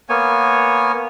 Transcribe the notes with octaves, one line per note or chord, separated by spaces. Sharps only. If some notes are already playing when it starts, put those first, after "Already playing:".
A#3 B3 C#5 G#5